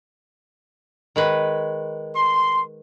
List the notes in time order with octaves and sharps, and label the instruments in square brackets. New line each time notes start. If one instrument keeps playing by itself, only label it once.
[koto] D#3 G#3 B4
[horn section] C6